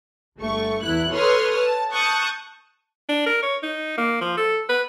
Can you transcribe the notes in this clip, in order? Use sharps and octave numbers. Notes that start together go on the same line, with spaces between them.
G1 A3 C#6
E2 E4 F#6
A4 B4 C#5 C6 D#6 F6
A5
A5 C#6 D#6 F#6 G6
D4
A#4
C#5
D#4
A#3
F3
A4
B4